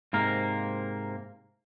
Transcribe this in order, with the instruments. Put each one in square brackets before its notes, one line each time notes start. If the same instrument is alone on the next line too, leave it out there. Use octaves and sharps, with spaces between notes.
[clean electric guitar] G#2 C3 A#3 A#4